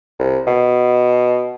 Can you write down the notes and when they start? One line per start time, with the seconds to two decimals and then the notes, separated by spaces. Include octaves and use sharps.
0.19 C2
0.47 B2